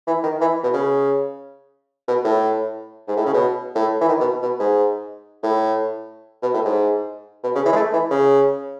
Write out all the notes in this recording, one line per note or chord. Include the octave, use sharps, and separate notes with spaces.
E3
D#3
E3
B2
C#3
B2
A2
G#2
A2
C#3
B2
A2
E3
D#3
B2
B2
G#2
A2
B2
A2
G#2
B2
C#3
E3
G#3
A3
E3
C#3